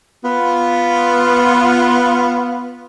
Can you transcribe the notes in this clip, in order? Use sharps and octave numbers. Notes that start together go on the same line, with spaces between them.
B3 F4